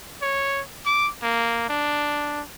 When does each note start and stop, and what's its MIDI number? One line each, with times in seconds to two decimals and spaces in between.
0.22 0.62 73
0.86 1.09 86
1.22 1.66 58
1.69 2.41 62